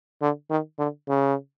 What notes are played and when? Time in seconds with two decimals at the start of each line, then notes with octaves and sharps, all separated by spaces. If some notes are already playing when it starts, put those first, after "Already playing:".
0.22 D3
0.50 D#3
0.79 D3
1.08 C#3